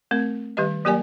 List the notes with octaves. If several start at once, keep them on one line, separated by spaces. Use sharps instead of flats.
A3 C4 A#4
D#3 G3 G4 B4 D#5
F#3 A#3 G4 A#4 D5 G#5